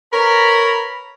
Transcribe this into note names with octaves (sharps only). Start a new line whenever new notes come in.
A#4 B4 C#5 A#5 B5